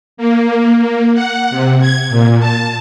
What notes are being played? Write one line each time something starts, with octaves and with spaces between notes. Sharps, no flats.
A#3
A#3
F#5
C3
G#6
A#2
A5